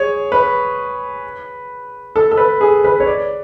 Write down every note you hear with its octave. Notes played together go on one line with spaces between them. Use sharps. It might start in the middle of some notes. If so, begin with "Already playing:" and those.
Already playing: G#4 C#5
B4
A4
A4
B4
G#4
B4
C#5
D5